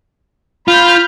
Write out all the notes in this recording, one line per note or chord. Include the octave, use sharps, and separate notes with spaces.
F4 B5 F6 G6